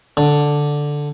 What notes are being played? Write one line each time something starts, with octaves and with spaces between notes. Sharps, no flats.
D3